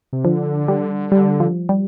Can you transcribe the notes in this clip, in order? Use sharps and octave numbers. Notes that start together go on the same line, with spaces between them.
C3
D3 F3
G3
G3
F3
G3